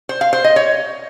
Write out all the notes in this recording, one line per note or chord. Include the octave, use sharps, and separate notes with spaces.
C5
F5
C5
D#5
C#5